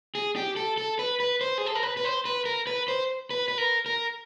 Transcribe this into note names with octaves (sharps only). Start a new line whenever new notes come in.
G#4
G4
A4
A4
B4
B4
C5
G#4
A4
A#4
B4
B4
C5
B4
A#4
B4
C5
B4
B4
A#4
A#4